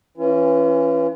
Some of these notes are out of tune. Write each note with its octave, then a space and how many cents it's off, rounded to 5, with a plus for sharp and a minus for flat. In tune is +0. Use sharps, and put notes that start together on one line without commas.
E3 +0 C#4 -10 F4 -45